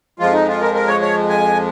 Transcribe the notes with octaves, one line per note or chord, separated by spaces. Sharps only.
F2 F3 G#3 F4
D#4
F4
A#4
A#4
C#5
C#5
G#5